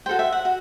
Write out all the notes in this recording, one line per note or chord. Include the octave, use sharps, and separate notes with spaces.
F#4 A4 C5 G5
E5
F#5
F#4